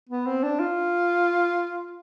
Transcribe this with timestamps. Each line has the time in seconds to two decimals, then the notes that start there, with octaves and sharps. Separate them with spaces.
0.09 B3
0.26 C4
0.43 D4
0.60 F4